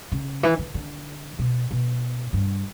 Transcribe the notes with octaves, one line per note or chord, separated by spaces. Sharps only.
C#3
E3
D3
D3
B2
B2
G2